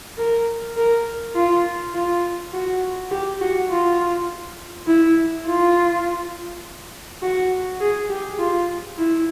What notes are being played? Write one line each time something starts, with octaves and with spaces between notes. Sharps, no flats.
A#4
A#4
F4
F4
F#4
G4
F#4
F4
E4
F4
F#4
G#4
G4
F4
E4